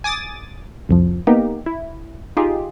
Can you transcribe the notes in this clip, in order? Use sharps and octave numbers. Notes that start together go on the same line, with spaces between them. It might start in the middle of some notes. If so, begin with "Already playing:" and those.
G#5 D6 D#6 A6
C2 F2 F3
A#3 B3 D#4 G4
E4
D#4 F4 G4 G#4